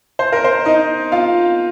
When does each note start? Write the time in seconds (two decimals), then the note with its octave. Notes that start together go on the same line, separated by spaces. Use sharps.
0.19 C5
0.33 A#4
0.44 C5
0.65 D#4 D#5
1.12 F4 F5